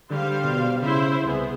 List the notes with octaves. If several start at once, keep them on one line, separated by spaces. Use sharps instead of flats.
D3 G3 C5 F5
B2
C#3 E4 C5 E5
C2 B3 G#4